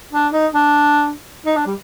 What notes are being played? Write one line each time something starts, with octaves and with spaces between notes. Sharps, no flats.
D4
D#4
D4
D#4
D4
G3